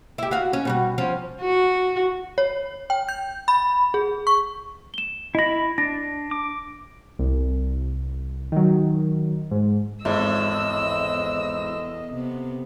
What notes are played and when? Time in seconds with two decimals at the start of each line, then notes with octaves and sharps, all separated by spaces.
0.18 E4 G4
0.31 F#4 F5
0.53 C#4
0.65 B2 G3 F#4
0.98 F3 C#4
1.42 F#4
2.38 C#5
2.90 G5
3.09 G6
3.48 B5
3.94 G#4
4.27 C#6
4.94 E7 G7
5.35 E4 D#5 B5 A#6
5.78 D4 A#6
6.31 D6
7.19 C2
8.52 D#3 F#3
9.51 G#2
10.05 G#1 E2 A2 D#5 E6
12.13 C3 B3